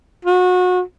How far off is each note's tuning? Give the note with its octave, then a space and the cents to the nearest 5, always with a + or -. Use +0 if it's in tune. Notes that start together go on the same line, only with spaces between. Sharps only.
F#4 -30